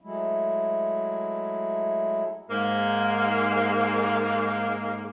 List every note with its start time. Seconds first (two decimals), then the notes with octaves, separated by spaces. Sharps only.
0.01 F#3 G#3 A3 E4
2.50 G#2 A#3